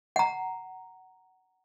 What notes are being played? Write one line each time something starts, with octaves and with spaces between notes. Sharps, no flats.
F#5 A#5